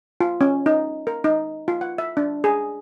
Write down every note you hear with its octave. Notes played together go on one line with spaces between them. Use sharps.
F4
C#4
D#4
A#4
D#4
F4
F#5
E5
D4
G#4